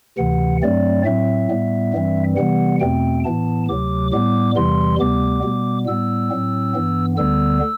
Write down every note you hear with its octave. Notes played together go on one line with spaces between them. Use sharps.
D2 C3 E3 F#5
G2 F#3 A3 C4 D5
A2 F#3 C4 E5
A2 G3 B3
G2 E3 G3 C4
C3 E3 G3 B3 F#5
E2 B2 A3 C4 G5
A2 E3 B3 A5
D2 C3 F#3 D6
A2 G3 B3 D6
E2 C3 E3 G3 C6
D2 C3 G3 B3 D6
B2 G3 B3
A2 G3 B3 E6
A2 F#3 C4
G2 E3 B3
D2 D3 G3 B3 E6